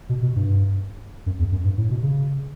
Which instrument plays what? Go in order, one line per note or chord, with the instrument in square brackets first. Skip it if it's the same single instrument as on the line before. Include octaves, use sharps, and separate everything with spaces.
[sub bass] B2
B2
G2
F#2
E2
F#2
G2
A2
B2
C#3